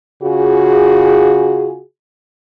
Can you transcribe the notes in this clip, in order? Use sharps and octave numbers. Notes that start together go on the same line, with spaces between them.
C#3 F4 F#4 G#4